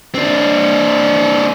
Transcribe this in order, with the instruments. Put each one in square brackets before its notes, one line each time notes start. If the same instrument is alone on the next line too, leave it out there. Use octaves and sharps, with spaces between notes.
[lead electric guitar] C4 D4